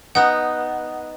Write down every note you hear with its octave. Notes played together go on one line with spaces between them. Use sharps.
B3 D#4 F#5